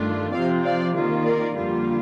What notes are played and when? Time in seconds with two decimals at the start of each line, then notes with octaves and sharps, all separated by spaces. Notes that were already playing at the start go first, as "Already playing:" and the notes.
Already playing: G2 D#3 A3 D4 F4
0.33 C3 F3 C4 F4 D5 F5
0.64 D5 F5
0.95 D#3 A#3 F4
1.25 A#4 D5
1.55 F2 D3 G3 A#3 F4